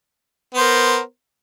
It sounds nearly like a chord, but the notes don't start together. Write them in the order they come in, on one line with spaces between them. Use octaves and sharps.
B3 C5 A#4